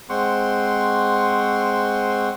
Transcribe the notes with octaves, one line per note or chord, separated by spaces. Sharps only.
G#3 C4 C5 F#5 C6 C#6